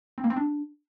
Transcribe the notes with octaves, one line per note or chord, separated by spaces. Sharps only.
C4
A#3
C4
D4